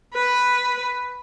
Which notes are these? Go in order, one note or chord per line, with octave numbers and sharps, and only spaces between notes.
B4